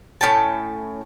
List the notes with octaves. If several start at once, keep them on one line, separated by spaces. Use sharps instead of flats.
A2 C#4 G5 A5